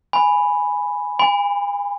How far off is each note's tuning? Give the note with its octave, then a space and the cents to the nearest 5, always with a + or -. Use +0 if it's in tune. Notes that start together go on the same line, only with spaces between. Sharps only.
G#5 +0 B5 +0
G#5 -40 B5 +30